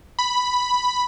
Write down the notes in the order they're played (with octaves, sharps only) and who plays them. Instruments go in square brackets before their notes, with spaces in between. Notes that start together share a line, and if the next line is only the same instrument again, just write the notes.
[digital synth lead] B5